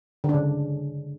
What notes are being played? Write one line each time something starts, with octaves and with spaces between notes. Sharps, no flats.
D3
D4
C#3